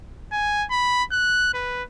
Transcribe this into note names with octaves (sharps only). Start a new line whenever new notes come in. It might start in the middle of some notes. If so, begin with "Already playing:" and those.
G#5
B5
F#6
B4